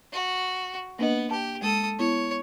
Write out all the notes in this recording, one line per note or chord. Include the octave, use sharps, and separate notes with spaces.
F#4
A#3 B3 D4 D#5
G4 A5
G#3 A4 D#6
B3 E4 C#5